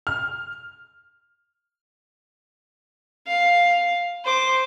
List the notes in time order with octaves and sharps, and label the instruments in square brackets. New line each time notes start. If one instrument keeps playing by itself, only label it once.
[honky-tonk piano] F6
[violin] F5
C5 D6